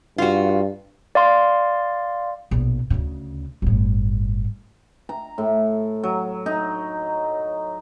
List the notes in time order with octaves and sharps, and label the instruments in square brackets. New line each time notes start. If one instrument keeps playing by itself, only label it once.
[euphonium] G2 [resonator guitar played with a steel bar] F4 F#4
[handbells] D5 F5 C6
[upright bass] A#1 B2
D2 C#3
G1 A2
[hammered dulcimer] A#5
A2
F#3
D#4